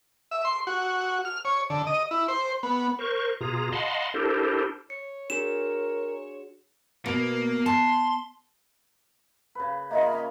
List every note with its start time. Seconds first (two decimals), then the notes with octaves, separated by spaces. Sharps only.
0.31 E5
0.45 C6
0.67 F#4
1.25 F6
1.45 C#5
1.70 D3
1.87 D#5
2.11 E4
2.28 C5
2.63 B3
2.99 A#4 C5 C#6
3.41 B2 F4 G#4 A#5
3.72 D#5 F5 F#5 A5 B5 C6
4.14 D4 E4 G4 A4 A#4 C5
4.90 C#5 C#7
5.30 D4 F#4 G#4 A#4 E7
7.06 B2 A#3
7.66 A5 C6
9.55 C#3 B4
9.91 A#3 F4 G#4 D#5 E5 B5
10.13 C#4